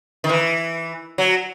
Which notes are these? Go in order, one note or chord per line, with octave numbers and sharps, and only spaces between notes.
D#3
E3
F#3